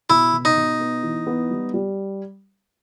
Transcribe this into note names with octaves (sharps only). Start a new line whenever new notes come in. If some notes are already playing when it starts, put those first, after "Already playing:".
B2 E4
B2
D#4
B2
B3
E3
B3
G3
G3